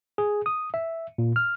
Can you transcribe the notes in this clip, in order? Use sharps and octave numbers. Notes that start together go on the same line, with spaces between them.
G#4
D#6
E5
A#2
F6